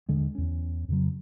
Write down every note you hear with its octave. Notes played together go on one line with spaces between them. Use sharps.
D#2 D3 G#3
E2 C#4
F2 C#3 F#3